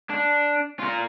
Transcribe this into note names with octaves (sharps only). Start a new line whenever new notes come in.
D4
F4 A#4